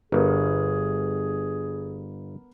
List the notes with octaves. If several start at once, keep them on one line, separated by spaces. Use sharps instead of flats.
G1 B3 G#4 A#4